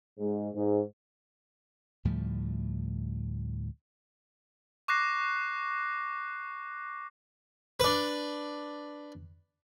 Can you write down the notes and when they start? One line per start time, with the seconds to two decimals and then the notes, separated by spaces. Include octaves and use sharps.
0.19 G#2
0.54 G#2
2.05 D2 A2 F3 G3
4.88 C#6 D6 F#6 A#6 C7
7.80 D4 B4